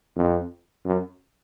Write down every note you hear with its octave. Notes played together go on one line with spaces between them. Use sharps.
F2
F#2